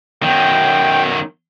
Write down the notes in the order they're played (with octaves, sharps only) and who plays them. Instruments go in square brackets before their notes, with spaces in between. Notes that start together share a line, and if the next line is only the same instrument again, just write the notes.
[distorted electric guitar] F#2 D#3 [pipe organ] G5